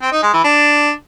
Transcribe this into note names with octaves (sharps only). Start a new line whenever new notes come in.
C4
D#4
G#3
E3
D4